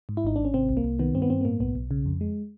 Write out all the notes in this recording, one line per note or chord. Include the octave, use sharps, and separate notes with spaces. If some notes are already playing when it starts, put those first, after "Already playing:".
G#2
E4
G#1 D#4
G#1 D4
C#4
C3 C4
C2
A#3
C2
D#3 B3
G2 C4
B3
G2 C4
B3
A2 A#3
B1 B3
B1
C#3
F2
G#3